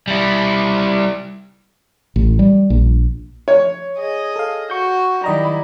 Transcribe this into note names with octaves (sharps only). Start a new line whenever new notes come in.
G3 E4
A1
G3
A#1
C#5
G#4 D#5
A4 F5
F#4 C#6 G6
D#3 F#3 G3 E4 D#5 A#5